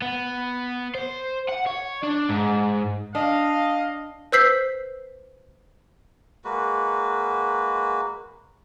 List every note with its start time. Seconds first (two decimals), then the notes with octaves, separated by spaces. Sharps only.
0.02 B3
0.95 C5
1.49 F#5
1.67 C#5
2.03 D4 D5
2.29 G#2
3.15 D4 D#5 F5
4.32 B4 C5 E6 G6 B6 C7
6.45 G#3 A#3 F#4 B4